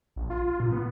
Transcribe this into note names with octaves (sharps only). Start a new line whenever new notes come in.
A#1
F4
F4
A#2
B3